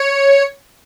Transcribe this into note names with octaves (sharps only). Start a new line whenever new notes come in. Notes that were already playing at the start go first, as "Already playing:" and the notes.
Already playing: C#5